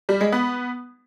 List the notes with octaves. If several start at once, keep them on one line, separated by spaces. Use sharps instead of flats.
G3
G#3
B3